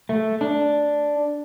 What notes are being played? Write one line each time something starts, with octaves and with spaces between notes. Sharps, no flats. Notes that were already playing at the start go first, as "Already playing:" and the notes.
A3
D4